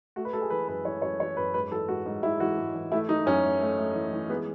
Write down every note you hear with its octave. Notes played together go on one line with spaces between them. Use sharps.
A3 F#4
B4
A3 A4
G#4
E3 B4
F#2 B4
E3 C#5
F#2 C#5
E3 C#5
F#2 B4
G#2 B4
E3 A4
G#2 F#4
G#2
G#2 E4
E3 F#4
G#2
E3
A3 E4
E3 D#4
F#2 C#4
A3
A3
A3
E3
E3
G#3 B3